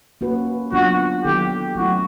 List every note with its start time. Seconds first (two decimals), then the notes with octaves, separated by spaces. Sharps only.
0.21 A#3 C#4 F#4 B4
0.72 F#3 B3 D4 F4 F#4
1.24 D#3 F#3 B3 E4 G4 A4
1.75 F#3 A3 C#4 E4 F#4